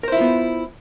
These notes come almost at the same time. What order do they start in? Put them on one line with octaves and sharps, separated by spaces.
A#4 C5 E4 F4 B3